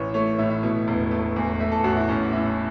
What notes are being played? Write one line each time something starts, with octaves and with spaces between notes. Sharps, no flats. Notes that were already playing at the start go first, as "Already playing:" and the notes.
Already playing: A1 E3 C#5
A3 C#5
A2 E5
E5
B2
E1
A3
E2
A3 E5
A4
A1 F#4
E4
A1 C#4
A2 E5